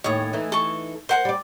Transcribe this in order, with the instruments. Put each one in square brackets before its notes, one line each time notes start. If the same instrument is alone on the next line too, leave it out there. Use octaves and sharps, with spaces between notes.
[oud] D#2 A2 C#4 [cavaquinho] C#5 D#6
[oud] E3 A3 D#4
[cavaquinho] A4 C#6
[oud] A#4 [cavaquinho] C5 F#5 A5
[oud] G3 D5